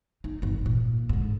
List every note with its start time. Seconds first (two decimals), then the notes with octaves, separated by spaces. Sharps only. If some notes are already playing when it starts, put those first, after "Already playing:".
0.24 D#4
0.42 G#1 E3
0.66 A#2
1.09 G#2 D3